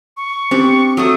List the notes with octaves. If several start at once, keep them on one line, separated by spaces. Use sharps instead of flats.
C#6
C4 D4 G4
F#3 A3 A4 D#6